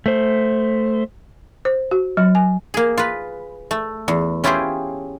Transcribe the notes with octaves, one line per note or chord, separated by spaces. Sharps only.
A3 C5
C5
F#4
F#3
G#5
A#3 G#4
F4 B4
A3
E2
C#4 E4 F4 G4 G#4 C5